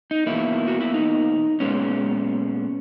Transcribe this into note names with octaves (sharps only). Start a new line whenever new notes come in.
D#4
E2 B2 A#3 E4
F#4
E4
D#4
A#2 G#3 B3 C#4